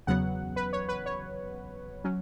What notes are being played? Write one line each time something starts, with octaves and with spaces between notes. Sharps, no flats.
E2 C#3 F#3 B3 F#5
B4
C#5
B4
C#5
F#3 C#4